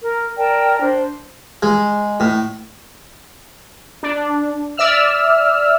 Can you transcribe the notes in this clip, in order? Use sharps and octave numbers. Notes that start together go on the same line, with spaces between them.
A#4
A#4 D5 G5 A5
D4 C5
G#3
A2
D4
D5 E5 E6 F6